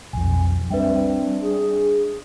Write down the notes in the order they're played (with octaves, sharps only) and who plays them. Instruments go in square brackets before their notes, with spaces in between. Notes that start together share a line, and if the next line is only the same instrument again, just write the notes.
[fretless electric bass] B1 F2 [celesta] G#5
[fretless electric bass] G3 [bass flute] C4 [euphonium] D4 [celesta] B4 E5 G5
[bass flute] G#4